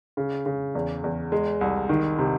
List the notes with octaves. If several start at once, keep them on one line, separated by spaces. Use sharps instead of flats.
C#3
C#3
E2
E2
G#3
C2
D#3
C3